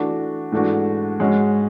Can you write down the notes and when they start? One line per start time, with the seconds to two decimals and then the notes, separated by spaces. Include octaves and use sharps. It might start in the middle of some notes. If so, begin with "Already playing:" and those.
Already playing: E3 A3 D4 F#4
0.52 G#2 E3 A3 D4 F#4
1.20 G#2 G#3 C#4 F#4